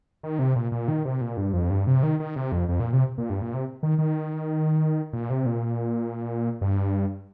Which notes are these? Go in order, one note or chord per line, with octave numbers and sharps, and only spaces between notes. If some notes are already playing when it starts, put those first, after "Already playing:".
D#3
C3
A#2
A#2
D#3
C3
A#2
G2
F2
G2
C3
D#3
D#3
C3
F2
F2
A#2
C3
A#2
G2
A#2
C3
D#3
D#3
A#2
C3
A#2
G2